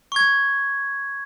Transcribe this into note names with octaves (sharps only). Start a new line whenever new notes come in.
C#6 G#6